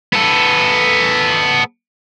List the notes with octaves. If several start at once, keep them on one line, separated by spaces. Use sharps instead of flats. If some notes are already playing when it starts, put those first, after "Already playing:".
B3 A4